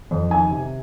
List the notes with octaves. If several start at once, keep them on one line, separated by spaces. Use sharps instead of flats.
F2
D#3 G#5
C3